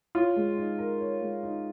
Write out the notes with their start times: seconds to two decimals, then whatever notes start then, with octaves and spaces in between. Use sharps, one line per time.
0.15 F4 C#5
0.36 G#3
0.57 D#4
0.79 A#4
1.00 C#5
1.21 G#3
1.43 D#4